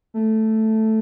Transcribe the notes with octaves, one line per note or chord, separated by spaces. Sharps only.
A3